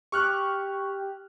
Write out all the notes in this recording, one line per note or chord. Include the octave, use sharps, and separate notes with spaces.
G4 C#6 F6 F#6